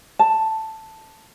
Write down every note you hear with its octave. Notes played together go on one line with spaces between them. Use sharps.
A5